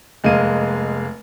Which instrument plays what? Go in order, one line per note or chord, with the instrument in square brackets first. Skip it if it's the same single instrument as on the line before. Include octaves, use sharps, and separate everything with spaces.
[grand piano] F1 G#3 A#3 F5 D#7